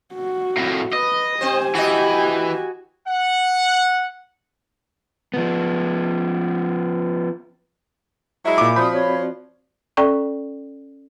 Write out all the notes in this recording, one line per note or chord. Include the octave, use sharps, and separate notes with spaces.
F#4
F2 A2
B4 D#5
C4 G4 C5 G#5
E3 F#4 D#5
F#5
F3 B3
F#3 G#3 E4
A#2 E5 B5 D6
F3 C4 F#4 D5 B5 D#6 G6
C#5
C#4 A4 D5 G5 C#6